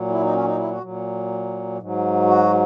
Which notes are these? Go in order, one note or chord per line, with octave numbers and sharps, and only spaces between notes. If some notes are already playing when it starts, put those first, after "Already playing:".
Already playing: A#2 F#3
E4
D#4
C#4
D#4
E4
F#4
A#2 F#3
G#2 F#3
F#4